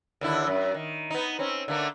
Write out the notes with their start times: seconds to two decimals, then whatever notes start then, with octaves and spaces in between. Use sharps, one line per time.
0.21 D#2 D3 E4
0.47 F#2
0.74 D#3
1.10 B3 D#4
1.39 C4 C#4
1.68 D3 A3 A#3